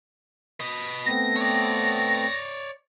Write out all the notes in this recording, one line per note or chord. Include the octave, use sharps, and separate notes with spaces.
B4 D#5
A3 B3 C4 A#6
C#5 D5